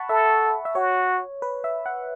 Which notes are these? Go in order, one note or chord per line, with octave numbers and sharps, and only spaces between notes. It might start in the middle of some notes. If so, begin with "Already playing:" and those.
Already playing: F#5 A5 B5 C#6
A4 E5
E5
F#4 C#5
B4
E5
F#5